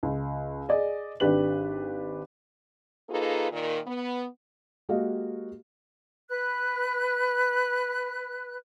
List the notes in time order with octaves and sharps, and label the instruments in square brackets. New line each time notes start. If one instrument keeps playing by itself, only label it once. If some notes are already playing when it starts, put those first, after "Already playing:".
[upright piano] C#2
G#4 D5 D#5
G#1 D4 G4 B4 F#7
[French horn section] A#3 D#4 F4 G#4 A4 B4
A#2 D#3
B3
[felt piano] G#3 A#3 F#4 G4 D#5 F5
[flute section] B4 F#6